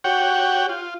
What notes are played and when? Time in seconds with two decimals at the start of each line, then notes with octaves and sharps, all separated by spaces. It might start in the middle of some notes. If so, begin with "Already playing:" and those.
0.04 F#4 G4 C#5 F#5 G5
0.69 F4